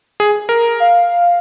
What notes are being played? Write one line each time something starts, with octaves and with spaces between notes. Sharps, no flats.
G#4
A#4
F5